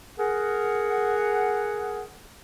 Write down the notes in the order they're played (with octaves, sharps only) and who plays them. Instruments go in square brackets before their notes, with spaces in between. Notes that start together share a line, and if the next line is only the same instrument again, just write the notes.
[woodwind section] G#4 A#4 F#5